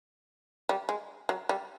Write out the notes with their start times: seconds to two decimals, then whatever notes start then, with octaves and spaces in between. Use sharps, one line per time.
0.69 G3
0.89 G#3
1.29 F#3
1.49 G3